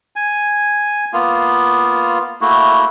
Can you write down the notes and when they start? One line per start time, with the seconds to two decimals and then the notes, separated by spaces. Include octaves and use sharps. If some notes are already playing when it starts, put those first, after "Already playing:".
0.16 G#5
1.13 A#3 B3 F4
2.41 A3 A#3 E4 F#4